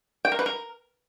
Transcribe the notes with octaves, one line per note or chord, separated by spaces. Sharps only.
G5
A#4
B4
A#4